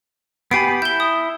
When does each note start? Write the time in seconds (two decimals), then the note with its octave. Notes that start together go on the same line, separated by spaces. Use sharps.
0.51 B3 G4 G#5 B5 C7 D7
0.82 E4 G6 G7
1.00 D#6